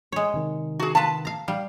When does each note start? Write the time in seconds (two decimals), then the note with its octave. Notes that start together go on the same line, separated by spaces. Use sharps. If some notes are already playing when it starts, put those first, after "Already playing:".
0.12 G#3 C#5
0.34 C3 D#3
0.80 F#4 G#4
0.95 F4 B4 A5
1.25 F5 A#5
1.48 G3 F5